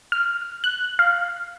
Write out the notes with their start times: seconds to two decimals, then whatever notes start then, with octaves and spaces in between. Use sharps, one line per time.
0.12 F6
0.64 F#6
0.99 F5